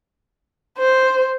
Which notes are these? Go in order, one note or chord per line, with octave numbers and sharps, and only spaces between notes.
C5